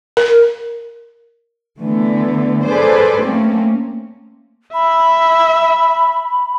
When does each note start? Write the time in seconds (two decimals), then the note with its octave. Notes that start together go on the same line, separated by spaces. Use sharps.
0.17 A#4
1.79 D3 E3 A3 B3
2.65 G#4 A4 B4 C5 D5
3.22 A3 A#3 C4 C#4
4.74 E5 B5